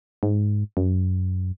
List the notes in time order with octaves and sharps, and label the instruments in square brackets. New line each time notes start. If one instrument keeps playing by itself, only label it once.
[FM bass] G#2
F#2